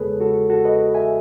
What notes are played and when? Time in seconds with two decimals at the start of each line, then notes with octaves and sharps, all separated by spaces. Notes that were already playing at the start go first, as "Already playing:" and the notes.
Already playing: E2 C#3 G#3 B3 G#4 A4 B4 C#5
0.20 F#4 A4
0.50 F#4 A4
0.65 B4 D#5
0.94 E5 G#5